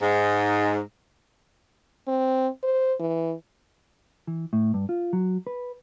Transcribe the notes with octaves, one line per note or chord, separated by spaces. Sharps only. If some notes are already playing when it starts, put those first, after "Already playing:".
G#2
C4
C5
E3
E3
A2
G2
F4
F#3
B4